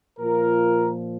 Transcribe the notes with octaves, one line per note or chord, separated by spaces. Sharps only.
A#2 F3 F4 A#4